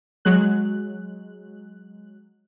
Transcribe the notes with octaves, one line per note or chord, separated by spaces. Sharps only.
F#3 G#3 F#6